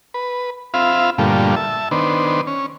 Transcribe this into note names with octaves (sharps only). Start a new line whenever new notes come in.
B4
C4 F4 E5 F5 B5
G2 A#2 D3 G3 A3 F4
E5 A5
D#3 B3 D4 C5
C#4